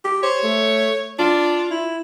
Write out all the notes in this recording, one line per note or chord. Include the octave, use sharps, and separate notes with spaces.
G4
C5 C#5
A3
D4 F4
E4